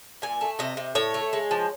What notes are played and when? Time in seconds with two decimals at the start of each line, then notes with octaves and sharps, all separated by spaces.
0.22 A#2 G#5
0.41 A3
0.59 C3 D#5
0.77 C3
0.95 A2 C#5
1.14 A3
1.33 G#3
1.51 F3